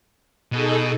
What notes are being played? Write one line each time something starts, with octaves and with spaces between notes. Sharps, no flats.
B2 D#4 G#4 A4